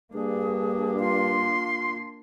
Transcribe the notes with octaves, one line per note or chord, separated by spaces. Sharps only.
G2 A#3 D4 G#4
F4 C6